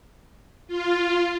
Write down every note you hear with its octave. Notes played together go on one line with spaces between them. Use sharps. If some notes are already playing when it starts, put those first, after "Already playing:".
F4